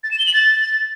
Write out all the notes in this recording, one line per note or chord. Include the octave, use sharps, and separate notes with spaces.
A6
E7
G7
F#7
A6